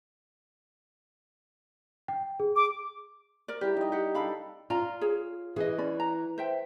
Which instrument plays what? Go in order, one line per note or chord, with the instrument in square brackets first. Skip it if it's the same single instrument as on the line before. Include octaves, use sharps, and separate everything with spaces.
[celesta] G5
G#4
[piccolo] D6
[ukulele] A#4 D5
[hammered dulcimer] G3 E4 A#4 [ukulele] G4
[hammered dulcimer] D#4 D#5
[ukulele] G4 F#5
[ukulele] D4 F5 B5 [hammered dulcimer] G4 A4 G5
[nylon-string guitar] F4 [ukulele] D5 A#5
[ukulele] G#4 C#5
[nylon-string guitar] E3 [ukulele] G#4 D#5
[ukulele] C#4 D5 B5
A#5
C5 E5 G5